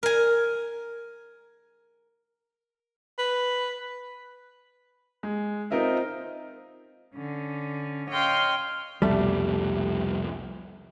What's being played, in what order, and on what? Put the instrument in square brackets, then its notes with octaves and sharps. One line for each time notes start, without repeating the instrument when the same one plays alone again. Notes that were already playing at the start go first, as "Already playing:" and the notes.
[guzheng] A#4 G#5
[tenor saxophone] B4
[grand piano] G#3
C4 D#4 F4 A#4 D#5 E5
[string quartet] D3 C#4
C#5 D#5 F5 G5 C6
[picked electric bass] C2 F2 B2 [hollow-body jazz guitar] G3 A3